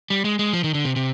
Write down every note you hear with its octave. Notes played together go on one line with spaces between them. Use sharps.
G3
G#3
G#3
F3
D#3
D3
C3
C3